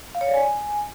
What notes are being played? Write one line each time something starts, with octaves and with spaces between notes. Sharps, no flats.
F5
C#5
D5
G#5